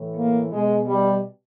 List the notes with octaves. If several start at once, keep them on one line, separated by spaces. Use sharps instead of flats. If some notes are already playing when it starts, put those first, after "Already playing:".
Already playing: A2 E3
A#3
B2 G#3
G3